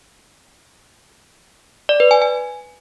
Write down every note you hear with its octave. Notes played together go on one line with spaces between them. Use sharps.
D5
B4
G#5
G#5